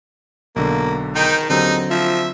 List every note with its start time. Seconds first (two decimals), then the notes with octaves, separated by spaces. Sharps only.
0.56 B1 D3 A#3
1.15 D#3 D#4 G5
1.50 D#2 D3 F#3 C4 D#4
1.90 F3 E5